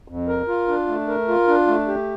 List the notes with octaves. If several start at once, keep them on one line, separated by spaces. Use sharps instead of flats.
F2
A#4
F4
D4
A3
A#4
F4
D4
A3
G4